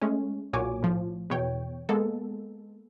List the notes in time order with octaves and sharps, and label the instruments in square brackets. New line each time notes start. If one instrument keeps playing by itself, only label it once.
[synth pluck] G#3 A3 C#4
B1 A#2 F#4 C#5 G#5 D6
A2 F3
E2 B2 C#5 G5
G#3 A#3 B3 A4